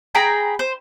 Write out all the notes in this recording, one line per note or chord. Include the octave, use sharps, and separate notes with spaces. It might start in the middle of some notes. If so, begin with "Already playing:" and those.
G#4 G5 A#5 B5
C5